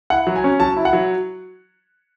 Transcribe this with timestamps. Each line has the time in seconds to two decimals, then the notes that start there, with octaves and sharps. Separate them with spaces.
0.10 E4 F#5
0.27 F#3
0.36 G#5
0.44 C#4
0.60 F#3 A5
0.76 E4
0.85 F#5
0.93 F#3